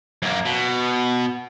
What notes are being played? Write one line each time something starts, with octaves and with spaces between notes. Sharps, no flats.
F#2 A#3
B2